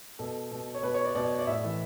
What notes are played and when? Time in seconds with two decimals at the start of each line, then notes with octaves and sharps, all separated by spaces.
0.19 B2 A4
0.51 B2
0.74 C#5
0.83 B2 B4
0.94 C#5
1.05 D5
1.15 B2 D5
1.39 D5
1.47 A2 E5
1.64 E3